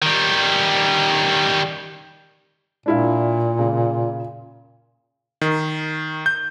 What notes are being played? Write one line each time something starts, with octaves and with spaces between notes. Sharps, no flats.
D#3 G3
A#2 D4 E4 F5
C#3
D#3
G6